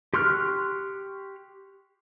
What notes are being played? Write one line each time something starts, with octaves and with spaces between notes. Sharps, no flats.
G4 C6 C#6 F6 F#6